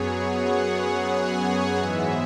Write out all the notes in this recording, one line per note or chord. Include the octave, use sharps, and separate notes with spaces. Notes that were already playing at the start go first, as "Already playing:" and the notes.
Already playing: F#2 F#3 B3 G#4 C#5
F#5
G#5
G#5
G#2 E3 G#3 B3 E5